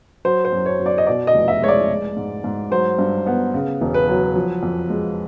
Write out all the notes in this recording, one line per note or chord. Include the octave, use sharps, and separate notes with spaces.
F#3 C5
C5
F#2
C#5
F#2
D5
D#5
B2 D5
D#5
F1
E5
G#3 C#5
D5
G#3
G#2
G#2
F#3 C5
G2
B3
C#3
E1
B4
F#3
F3
F2
G#3